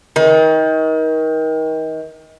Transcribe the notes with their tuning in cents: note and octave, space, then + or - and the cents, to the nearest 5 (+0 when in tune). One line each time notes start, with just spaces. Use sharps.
D#3 +30